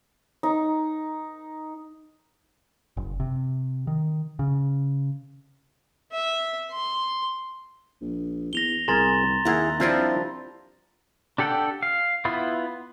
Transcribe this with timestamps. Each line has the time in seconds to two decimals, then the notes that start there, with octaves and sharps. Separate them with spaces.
0.43 D#4
2.97 F#1
3.20 C3
3.87 D#3
4.39 C#3
6.12 E5
6.71 C6
8.01 A#1
8.53 E2 A#6 F7 G7
8.88 C2 G#4 A#4 A#5 C6 A6
9.45 D#2 E4 G#4 A#4 F#5
9.80 F3 G3 C4 D4 E4 F4
11.38 D4 G4 A4 F#5 G5
11.83 F5
12.25 B3 E4 F4